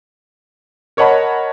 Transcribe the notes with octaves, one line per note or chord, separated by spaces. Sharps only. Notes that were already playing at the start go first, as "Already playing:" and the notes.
A#4 C#5 D#5 F#5 A5 B5